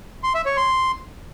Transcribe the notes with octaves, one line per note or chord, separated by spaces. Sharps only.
C6
E5
C#5
C6